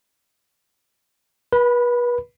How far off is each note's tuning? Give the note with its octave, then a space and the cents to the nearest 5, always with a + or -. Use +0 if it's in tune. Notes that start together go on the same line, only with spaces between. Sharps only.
B4 -35 B5 +0